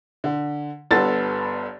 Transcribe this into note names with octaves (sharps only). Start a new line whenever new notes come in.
D3
G1 G2 B3 A4 A6